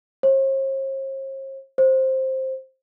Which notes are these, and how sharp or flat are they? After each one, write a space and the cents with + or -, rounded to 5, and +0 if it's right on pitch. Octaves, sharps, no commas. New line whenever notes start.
C5 +45
C5 +10